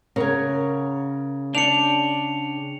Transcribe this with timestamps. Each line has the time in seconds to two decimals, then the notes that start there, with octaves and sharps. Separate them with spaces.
0.16 C#3 A#4 F#5 G#5
1.55 D4 D5 G5 C#7 F7